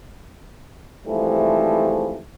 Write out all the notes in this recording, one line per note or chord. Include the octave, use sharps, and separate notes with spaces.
G#2 C3 E3 F3 G3 A3